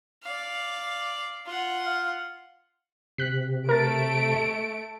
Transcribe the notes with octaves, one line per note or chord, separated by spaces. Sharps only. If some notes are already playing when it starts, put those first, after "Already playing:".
D5 F5
F4 F#5
F5
C3 F#6 B6
A3 A#4 A6 D7